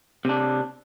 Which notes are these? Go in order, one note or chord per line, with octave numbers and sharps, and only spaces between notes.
C3 D4